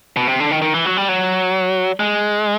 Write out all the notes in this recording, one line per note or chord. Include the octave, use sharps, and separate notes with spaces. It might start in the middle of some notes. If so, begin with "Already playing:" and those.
B2
C3
D3
D#3
D#3
E3
F#3
G3
F#3
G#3